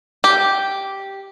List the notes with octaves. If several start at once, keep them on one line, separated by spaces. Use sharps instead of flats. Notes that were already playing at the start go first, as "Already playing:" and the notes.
G4